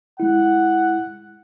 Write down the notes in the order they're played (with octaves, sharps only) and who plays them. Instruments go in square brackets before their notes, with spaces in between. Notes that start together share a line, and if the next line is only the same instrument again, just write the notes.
[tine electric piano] G#3 E4 [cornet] F#5